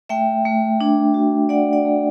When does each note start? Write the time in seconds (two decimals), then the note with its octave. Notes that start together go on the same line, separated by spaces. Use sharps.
0.09 A3 E5 G5
0.46 A3
0.81 D4
1.14 F#4
1.49 A3 D5 F#5
1.73 D5 F#5
1.85 A3